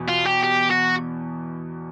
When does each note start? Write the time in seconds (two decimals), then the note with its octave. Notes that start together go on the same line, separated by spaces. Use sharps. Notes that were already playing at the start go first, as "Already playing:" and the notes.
Already playing: E2 B2
0.09 F4
0.27 G4
0.44 G4
0.71 F#4